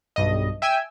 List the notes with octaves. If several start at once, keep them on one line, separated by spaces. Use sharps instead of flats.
B1 G2 D#5
E5 G5 G#5 E6